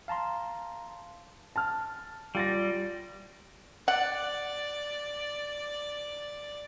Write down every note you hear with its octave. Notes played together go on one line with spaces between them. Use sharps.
F5 A5 A#5 C6
A5 F6
G3 F4 A6 A#6
D5 F#5